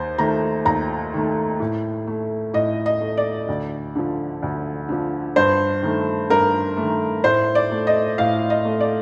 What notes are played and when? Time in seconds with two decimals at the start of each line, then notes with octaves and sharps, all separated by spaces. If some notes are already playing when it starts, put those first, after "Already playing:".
Already playing: D#2 C5
0.18 D#3 A3 A#5
0.65 D#2 A#5
1.14 D#3 A3
1.60 A2
2.07 A3
2.54 A2 D#5
2.86 D#5
3.01 A3
3.17 D5
3.48 D2
3.95 D3 F3
4.42 D2
4.89 D3 F3
5.36 G2 C5
5.83 D#3 A3
6.30 G2 A#4
6.77 A3
6.82 D#3
7.24 A2 C5
7.55 D5
7.71 A3
7.87 D#5
8.18 A2 F5
8.50 D#5
8.65 A3
8.80 D5